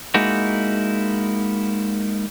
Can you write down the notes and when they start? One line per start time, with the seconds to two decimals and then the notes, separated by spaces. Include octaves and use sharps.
0.14 G#3 A#3 D#4 E4 F#4